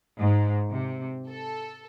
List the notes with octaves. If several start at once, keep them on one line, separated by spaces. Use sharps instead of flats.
G#2
C3
A4